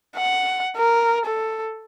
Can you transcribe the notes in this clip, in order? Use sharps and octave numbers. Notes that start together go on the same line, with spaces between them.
F#5
A#4
A4